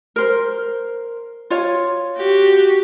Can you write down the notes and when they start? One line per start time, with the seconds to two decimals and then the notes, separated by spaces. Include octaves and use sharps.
0.16 A#4 C5
1.50 F4 C#5
2.16 F#4 G4